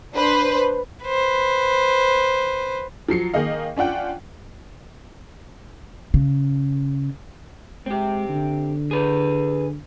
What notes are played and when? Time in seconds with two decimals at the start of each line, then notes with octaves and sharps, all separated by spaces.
0.15 D4 B4 C5
1.06 B4 C5
3.09 F3 F#3 C7 C#7
3.34 D#3 A#3 G#4 D#5 F5
3.77 C#4 D4 F4 F#5 G5
6.14 C#3
7.86 G#3 C4 G4
8.29 D3
8.91 G#4 B4